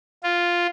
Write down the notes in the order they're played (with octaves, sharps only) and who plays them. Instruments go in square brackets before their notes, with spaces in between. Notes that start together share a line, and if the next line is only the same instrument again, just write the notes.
[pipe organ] F4